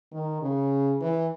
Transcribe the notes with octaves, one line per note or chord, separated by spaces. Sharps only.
D#3
C#3
E3